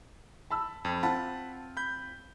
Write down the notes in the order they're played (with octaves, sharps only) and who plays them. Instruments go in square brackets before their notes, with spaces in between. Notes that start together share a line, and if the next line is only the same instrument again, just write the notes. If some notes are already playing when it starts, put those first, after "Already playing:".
[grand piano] A5 B5 E6
[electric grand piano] F2
[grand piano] C4 F4 [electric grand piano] F#5 A5 B5
[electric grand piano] B5 G6